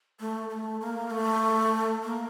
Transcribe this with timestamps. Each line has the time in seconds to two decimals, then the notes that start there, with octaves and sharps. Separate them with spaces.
0.20 A3
0.49 A3
0.81 A#3
1.11 A3
2.03 A#3